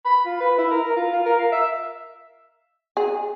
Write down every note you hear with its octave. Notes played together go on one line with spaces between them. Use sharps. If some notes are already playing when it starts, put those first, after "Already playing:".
B5
F4
B4
E4
A#4
A#4
F4
F4
A#4
F5
E5
G#4